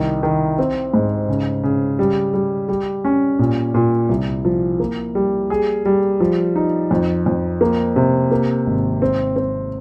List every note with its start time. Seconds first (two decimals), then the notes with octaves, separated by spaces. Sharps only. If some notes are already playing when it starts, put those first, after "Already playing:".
Already playing: C2 D#3
0.23 D#3
0.58 C4
0.94 G#2
1.28 C#3
1.63 C#3
1.99 G3
2.34 G3
2.69 G3
3.04 C#4
3.39 A#2
3.74 A#2
4.09 C2
4.45 F3
4.80 A#3
5.15 G3
5.50 G#4
5.86 G3
6.20 F3
6.56 D#4
6.91 F2
7.26 F2
7.61 A#3
7.96 C3
8.32 A#3
8.67 G#1
9.02 C4
9.36 C4